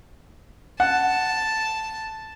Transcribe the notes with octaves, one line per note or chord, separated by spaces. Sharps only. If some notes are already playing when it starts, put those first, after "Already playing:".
F#5 A5